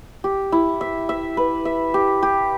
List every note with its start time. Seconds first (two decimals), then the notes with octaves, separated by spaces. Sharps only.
0.24 G4
0.52 E4
0.81 E5
1.09 E5
1.37 B4
1.65 E5
1.94 G4
2.23 G4